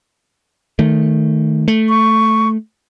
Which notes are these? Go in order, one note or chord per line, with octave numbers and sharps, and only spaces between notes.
D#3 A3
A3
C#6